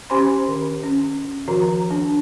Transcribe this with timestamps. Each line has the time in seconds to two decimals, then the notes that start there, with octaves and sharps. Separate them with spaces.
0.10 C#4 G4 C5 G#5 B5 C6
0.48 D#3
0.83 C#4
1.48 D#3 F3 F#4 A#5
1.91 D4